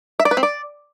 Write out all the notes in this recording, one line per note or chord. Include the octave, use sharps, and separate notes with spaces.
E5
D5
B4
C4
D5